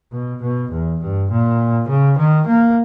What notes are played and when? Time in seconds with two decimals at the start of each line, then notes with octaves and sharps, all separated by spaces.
0.12 B2
0.42 B2
0.72 E2
1.01 G2
1.31 A#2
1.88 C#3
2.18 D#3
2.47 A#3